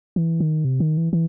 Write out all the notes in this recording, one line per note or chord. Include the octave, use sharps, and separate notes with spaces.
E3
D#3
C3
D#3
E3
E3